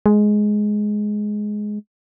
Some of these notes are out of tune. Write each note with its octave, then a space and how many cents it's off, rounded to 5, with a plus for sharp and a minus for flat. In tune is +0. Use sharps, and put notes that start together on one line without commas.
G#3 +10